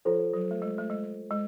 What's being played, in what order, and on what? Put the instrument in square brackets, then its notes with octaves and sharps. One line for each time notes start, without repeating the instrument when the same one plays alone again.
[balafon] F3 [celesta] F4 A4 C5
[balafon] F#3
A3
G#3
A3
G#3
G#3